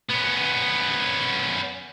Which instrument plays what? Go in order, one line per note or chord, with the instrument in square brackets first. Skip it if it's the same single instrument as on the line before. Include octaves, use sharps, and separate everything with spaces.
[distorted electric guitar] B3 C#4